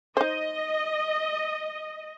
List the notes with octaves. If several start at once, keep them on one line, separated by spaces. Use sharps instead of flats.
D#4 C5 D#5